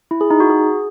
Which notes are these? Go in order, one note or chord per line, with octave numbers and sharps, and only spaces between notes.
E4
G#4
D#4
F#4
G#4